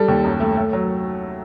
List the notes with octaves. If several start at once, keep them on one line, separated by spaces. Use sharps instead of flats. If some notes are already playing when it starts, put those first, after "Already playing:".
Already playing: G3 A4
D#2
F#2
A3
A3
F#3